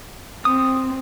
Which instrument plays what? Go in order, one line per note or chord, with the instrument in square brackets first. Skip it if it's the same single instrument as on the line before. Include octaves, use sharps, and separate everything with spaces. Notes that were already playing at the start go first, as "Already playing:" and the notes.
[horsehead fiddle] C4 [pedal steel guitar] D#6